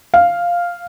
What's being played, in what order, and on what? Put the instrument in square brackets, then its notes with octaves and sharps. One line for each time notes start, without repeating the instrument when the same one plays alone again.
[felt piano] F5